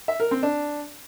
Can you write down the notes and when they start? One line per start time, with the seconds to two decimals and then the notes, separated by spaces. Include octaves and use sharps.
0.08 E5
0.20 A#4
0.31 C4
0.43 D4